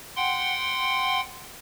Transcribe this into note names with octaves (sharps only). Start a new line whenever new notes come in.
F#5 G5 C6